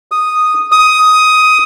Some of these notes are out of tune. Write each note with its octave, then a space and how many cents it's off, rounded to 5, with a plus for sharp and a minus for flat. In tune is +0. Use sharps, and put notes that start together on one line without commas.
D#6 -5
D#6 +10